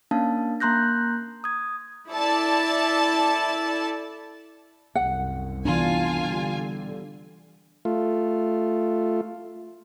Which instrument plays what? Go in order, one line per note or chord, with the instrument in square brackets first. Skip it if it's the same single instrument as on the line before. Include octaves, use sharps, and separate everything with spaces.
[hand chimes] A#3 C#4 D4 F5 A5
A#3 A#5 C6 F#6 G6 A#6
D#6 G#6
[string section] E4 A4 D5 A5
[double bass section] C2 F#2 C3 [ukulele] F#5
[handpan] E3 B3 D4 [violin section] F4 G#5
[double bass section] D3 G3
[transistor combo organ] A3 F4